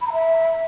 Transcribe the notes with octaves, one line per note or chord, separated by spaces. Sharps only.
B5
A#5
E5